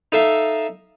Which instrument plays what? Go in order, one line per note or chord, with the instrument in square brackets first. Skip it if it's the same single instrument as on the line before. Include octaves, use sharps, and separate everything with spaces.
[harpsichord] D#4 A4 E5 F5